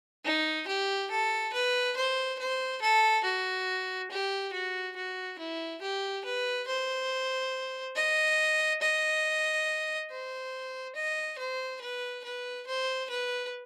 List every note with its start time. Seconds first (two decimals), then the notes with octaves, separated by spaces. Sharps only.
0.25 D#4
0.67 G4
1.11 A4
1.53 B4
1.96 C5
2.39 C5
2.82 A4
3.24 F#4
4.10 G4
4.53 F#4
4.96 F#4
5.39 E4
5.81 G4
6.24 B4
6.67 C5
7.96 D#5
8.81 D#5
10.10 C5
10.95 D#5
11.38 C5
11.81 B4
12.24 B4
12.67 C5
13.10 B4